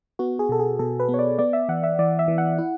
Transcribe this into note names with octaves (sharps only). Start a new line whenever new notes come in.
B3 F#4
G#4
B2 A4
G#4
B2 A4
B4
B3
C#5
D5
B3 D5
E5
E3 F#5
E5
E3 D5
E5
E3
F#5
E4